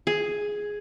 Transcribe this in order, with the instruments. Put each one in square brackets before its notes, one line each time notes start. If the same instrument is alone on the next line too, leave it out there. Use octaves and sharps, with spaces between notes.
[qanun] G#4